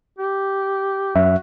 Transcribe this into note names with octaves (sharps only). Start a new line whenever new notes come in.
G4
F#2 F#4 E5